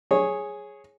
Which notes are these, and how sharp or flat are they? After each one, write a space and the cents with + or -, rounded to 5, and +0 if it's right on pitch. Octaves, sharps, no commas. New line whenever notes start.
G#4 +0 C#5 -10